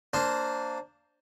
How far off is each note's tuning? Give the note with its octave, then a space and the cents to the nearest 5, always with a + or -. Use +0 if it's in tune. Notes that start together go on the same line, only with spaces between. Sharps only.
A#3 -15 D4 +0 C5 +5